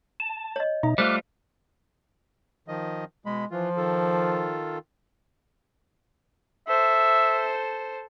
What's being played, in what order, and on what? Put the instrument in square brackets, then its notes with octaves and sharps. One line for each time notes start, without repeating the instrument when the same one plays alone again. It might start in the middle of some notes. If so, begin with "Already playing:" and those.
[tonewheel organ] A5
[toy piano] C#5 D#5
[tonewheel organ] B2 D#4 [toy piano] E5
[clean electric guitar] G3 A3 F4 [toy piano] C5 [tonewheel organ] D6 F6 F#6
[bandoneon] D#3 F3 D#5
[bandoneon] B2 B5 [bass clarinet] G#3
[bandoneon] E3 F4 [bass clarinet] F3
[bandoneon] D#3 F4 A4
[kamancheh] A4 C5 [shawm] E5